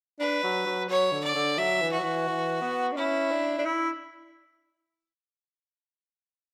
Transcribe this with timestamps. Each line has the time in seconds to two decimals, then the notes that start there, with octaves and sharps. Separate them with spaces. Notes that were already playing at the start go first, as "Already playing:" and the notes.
0.20 D4 B4
0.44 F#3
0.66 F#3
0.89 F#3 C#5
1.12 D3
1.24 D5
1.35 D3
1.58 F#3 E5
1.82 E3
1.93 F#4
1.99 F#3
2.04 E3
2.28 E3
2.61 B3
2.92 D4
2.96 C#4 E4
3.31 D4
3.59 D4
3.66 E4